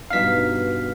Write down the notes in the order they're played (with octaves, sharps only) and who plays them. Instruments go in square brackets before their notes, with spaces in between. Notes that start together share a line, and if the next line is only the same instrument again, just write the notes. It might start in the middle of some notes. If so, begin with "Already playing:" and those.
[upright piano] G2 B2 D#4 [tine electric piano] F5 B6